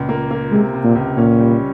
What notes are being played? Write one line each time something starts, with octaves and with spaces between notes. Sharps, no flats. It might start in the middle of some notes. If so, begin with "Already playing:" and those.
Already playing: C#2 A#2
A#3
A#3
C3 G#3
C3
A#2
C#2
A#2 C#4
G3